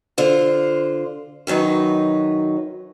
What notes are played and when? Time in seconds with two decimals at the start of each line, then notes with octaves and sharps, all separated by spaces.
0.18 D3 F4 C5
1.47 F#2 D#3 F#3 D#4 B4